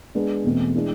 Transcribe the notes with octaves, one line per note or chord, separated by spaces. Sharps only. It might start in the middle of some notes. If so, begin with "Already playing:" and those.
G#3 B3 D4
E2 B2 A3 C4
E3 G#3 D4